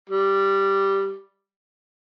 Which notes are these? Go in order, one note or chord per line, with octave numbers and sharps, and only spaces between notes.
G3